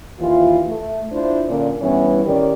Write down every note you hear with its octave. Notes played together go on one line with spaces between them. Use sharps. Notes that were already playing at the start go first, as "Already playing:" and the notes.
D#2 E3 F4
A3
D4 E4 F4 C5
A#2 D3 A#3 C#4 D4
G2 E3 G3 B3 C#4 E4
A2 D#3 C#4 G4 A#4 D5